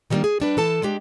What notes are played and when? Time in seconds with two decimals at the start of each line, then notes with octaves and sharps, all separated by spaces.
0.10 D#3 E3 G3 A3 A#3 D4
0.24 G#4
0.40 G3 D4 B4
0.57 E3 A4 A5
0.82 G#3 D4 G4